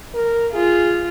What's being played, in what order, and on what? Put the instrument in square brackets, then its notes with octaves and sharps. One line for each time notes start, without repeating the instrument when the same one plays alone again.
[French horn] A#4
[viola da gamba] F4 [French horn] G#4